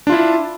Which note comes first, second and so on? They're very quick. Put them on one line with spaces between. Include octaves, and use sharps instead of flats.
D4 F4 E4